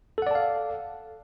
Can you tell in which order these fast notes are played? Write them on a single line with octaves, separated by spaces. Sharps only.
A4 F#5 D5 A5 F5